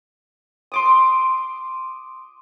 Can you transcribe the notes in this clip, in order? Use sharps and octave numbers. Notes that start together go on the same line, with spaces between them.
C6 D6 D#6